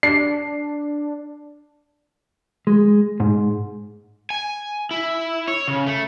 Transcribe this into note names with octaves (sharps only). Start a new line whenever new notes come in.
D4 C7
G#3
G#2
G#5
E4
C#5
C#3
A3